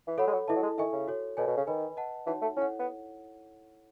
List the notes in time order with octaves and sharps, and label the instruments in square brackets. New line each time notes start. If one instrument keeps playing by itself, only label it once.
[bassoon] E3
[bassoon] F#3 [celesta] A4 C#5 F#5 B5
[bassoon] G#3
F#3
[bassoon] E3 [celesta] E4 A4 D#5 A5
[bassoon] F#3
G#3
[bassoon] D#3 [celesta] E4 A4 E5 G#5 C#6
[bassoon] C#3
[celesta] F#4 A4 C#5
[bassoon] B2 [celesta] A4 C#5 G#5
[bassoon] B2
C#3
[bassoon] D#3 [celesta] B4 D#5 G#5 B5
[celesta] B4 D#5 F#5 A5
[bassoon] E3 [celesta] D#4 F#4 C#5 F#5 A5
[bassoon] A3
[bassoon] C#4 [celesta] E4 A4 C#5 F#5
[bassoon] B3